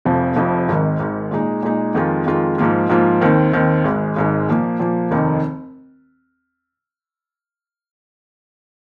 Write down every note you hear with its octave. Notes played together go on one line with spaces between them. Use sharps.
F1 F2 C3 F3
F1 F2 C3 F3
G#1 G#2 D#3
G#1 G#2 D#3
A#2 G#3 D#4
A#2 G#3 D#4
F2 D#3 G#3 F4
F2 D#3 G#3 F4
G#2 F3 A#3 F4
G#2 F3 A#3 F4
D#2 D#3 C4
D#2 D#3 C4
G#1 G#2 G#3
G#1 G#2 G#3
A#2 F3 A#3
A#2 F3 A#3
F1 D#2 D#3 A#3 D#4